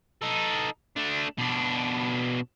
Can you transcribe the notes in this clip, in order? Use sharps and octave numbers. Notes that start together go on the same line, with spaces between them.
D#4 A4
A3 D4
B2 D4